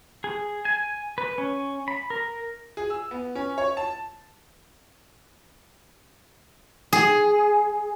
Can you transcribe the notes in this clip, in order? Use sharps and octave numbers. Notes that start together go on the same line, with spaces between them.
G#4
G#5
B4
C#4
B5
A#4
G#4
E6
B3
C#4
C#5
A5
G#4